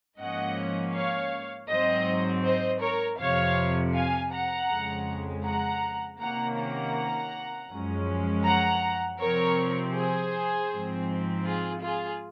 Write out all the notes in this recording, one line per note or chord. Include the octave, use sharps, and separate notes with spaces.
G#2 F3 A#3 C#4 D#5 F#5
C#5 F5
G#2 F#3 C4 C5 D#5
C5 D#5
A#4 C#5
F2 C3 F3 C#5 F5
F5 G#5
F#5 A#5
F2 C#3 G#3
F#5 A#5
C3 D#3 A#3 C#4 F#5 A#5
F#5 A#5
F#2 F3 G#3 C#4
F#5 A#5
C3 F3 C4 A#4 C#5
G#4 C5
G#2 F3 C4
F4 G#4
F4 G#4